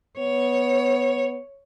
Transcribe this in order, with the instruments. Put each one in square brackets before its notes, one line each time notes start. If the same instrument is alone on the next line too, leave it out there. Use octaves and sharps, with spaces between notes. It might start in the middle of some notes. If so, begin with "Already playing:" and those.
[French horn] B3 [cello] C#5